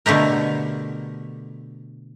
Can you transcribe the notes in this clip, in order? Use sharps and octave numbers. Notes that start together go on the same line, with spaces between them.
B2 D3 A3 G4 A#4